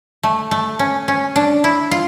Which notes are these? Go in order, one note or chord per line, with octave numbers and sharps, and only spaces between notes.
A3
A3
C#4
C#4
D4
E4
F4